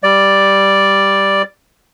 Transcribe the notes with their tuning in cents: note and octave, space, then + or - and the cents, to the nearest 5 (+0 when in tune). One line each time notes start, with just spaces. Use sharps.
G3 +0 D5 +0